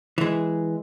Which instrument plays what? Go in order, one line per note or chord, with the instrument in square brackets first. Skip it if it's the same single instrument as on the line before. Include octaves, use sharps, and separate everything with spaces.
[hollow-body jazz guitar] E3 G#3